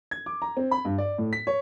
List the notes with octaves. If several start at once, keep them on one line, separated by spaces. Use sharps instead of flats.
G#6
D6
A#5
C4
B5
G2
D5
A2
B6
C#5